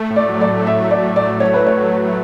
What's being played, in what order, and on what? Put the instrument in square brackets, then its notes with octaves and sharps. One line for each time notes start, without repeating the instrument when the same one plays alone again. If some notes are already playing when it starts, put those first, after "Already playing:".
Already playing: [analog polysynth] A3
A2
[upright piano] D5
[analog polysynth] F#3
[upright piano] D5
[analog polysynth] A2
[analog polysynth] A3 [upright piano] E5
[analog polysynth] A2
[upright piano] D5
[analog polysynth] F#3
[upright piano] D5
[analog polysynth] A2
[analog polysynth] A3 [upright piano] C#5
[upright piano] B4
[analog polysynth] A2
[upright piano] C#5
[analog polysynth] F#3
A2